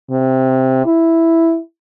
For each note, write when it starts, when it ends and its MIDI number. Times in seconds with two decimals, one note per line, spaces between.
0.11 0.86 48
0.86 1.59 64